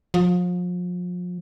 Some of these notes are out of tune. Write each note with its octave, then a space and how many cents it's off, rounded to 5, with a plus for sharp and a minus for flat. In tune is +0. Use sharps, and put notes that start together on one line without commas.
F3 +35